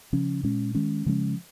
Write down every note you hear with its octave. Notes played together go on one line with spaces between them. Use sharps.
C#3 F3 C#4
A#2 G#3 C#4
D#3 G#3 C#4
C#3 F3 G#3 C#4